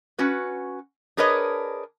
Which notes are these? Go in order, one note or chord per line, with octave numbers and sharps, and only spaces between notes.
C#4 F#4 B4
D4 G#4 A#4 B4 C#5 D#5